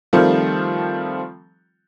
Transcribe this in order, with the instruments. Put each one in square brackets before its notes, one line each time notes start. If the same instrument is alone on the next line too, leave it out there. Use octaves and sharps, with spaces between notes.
[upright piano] D#3 F3 G3 A3 C4 F4